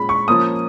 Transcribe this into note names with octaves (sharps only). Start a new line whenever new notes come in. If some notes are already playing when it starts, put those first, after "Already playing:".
Already playing: A#2 G#3 C#4 B5
C#6
F3 A#3 C#4 D#6